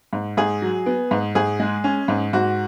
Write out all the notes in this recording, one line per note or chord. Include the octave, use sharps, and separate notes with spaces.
G#2
G#2 G#4
F#3
B3
G#2
G#2 G#4
G#3
C#4
G#2
G#2 F#4